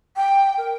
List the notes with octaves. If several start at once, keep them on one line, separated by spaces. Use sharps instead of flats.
G5
A#4